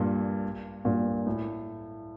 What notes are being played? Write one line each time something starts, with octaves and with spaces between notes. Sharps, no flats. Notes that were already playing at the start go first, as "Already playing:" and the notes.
Already playing: G2 A#2
G2 A#2
A2